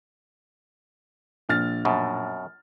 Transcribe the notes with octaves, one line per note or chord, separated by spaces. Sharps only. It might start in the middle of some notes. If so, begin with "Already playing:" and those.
A#1 F6 A6
F#2 B2